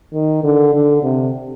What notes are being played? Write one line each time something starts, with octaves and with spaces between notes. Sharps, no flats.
D#3
D3
D3
C3